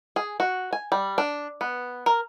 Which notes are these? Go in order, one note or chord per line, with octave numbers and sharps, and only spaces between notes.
G#4
F#4
G#5
G3
D4
B3
A#4